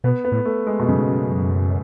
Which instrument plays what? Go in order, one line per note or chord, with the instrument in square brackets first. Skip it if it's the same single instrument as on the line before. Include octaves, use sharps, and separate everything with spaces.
[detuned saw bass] B2 [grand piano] B3
[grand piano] B3
[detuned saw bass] A2
[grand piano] A3
G#3
B2
[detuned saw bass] F#2 [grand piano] C#3
[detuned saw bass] G#2
F#2